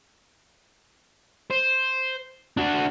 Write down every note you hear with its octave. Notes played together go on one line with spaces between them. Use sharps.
C5
D4 F#4